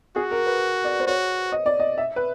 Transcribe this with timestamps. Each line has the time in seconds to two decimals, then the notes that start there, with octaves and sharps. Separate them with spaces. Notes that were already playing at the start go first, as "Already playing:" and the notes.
0.16 F#4 G#4
0.31 A#4
0.46 B4
0.84 D5
1.00 C5
1.07 F#4 C#5
1.52 D#5
1.66 D5
1.80 D#5
1.98 E5
2.16 B4